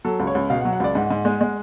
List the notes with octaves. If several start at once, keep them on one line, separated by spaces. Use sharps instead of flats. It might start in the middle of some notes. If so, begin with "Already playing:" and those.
F#3 A4
C#2
C#5
C#2
B2 F5
F#5
F#3
F#5
C#2 D5
G#2 F#5
G#2
G#3
G#3